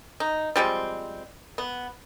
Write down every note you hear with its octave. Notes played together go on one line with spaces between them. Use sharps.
D#4
F3 G3 G#3 C4
B3